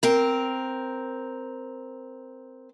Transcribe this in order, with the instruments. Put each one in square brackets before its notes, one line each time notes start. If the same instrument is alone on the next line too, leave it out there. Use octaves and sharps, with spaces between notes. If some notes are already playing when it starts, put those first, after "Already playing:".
[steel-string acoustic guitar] C4 A#4